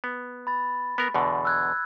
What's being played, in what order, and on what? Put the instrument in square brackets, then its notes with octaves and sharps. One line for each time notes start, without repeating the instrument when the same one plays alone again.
[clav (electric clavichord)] B3
[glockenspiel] B5 A6
[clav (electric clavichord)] B3 A#4
E2 B2 D3
[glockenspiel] E6 F#6 G#6